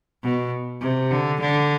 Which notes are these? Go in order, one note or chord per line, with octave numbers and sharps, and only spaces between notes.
B2
C3
D3
D3